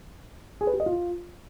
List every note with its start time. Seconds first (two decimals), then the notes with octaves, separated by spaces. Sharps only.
0.61 G#4
0.67 B4
0.73 G4
0.80 D#5
0.86 F4